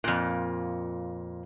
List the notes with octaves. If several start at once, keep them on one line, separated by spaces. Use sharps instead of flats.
F2 A#2